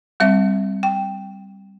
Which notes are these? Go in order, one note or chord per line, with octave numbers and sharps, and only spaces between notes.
G3 C4 E5
G5